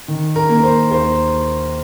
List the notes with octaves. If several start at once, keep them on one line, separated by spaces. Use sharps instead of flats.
D#3
A#4
A#3
A#4
C5
D#2 C5